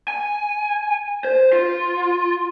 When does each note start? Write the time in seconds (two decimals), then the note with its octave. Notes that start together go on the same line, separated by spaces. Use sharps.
0.08 G#5
1.24 C5
1.53 F4